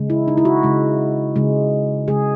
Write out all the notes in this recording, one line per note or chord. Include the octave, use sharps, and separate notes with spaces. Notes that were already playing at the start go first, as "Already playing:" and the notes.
Already playing: C#3 G#3
E4
D#4
E4
F#4
C#3 G#3
C#3 G#3
C#3 G#3 G#4